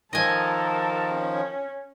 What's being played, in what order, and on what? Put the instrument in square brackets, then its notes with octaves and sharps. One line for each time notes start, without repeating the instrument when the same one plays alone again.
[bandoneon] D#3 F3 [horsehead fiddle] A4 A#4 [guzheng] D#5 G#5
[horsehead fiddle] C#4